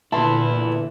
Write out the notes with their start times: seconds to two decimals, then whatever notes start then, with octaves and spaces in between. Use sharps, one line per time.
0.12 A#2 D3 E3 B3 E4 A5 C6